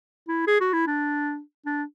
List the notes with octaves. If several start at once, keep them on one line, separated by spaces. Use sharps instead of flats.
E4
G#4
F#4
E4
D4
D4